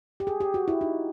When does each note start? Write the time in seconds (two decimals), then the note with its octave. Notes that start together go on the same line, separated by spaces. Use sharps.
0.20 G4
0.27 G#4
0.41 G4
0.54 F#4
0.68 E4
0.81 D#4